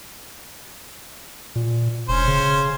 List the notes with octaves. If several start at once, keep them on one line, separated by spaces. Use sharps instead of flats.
A#2
E1 C#4 C5
C#3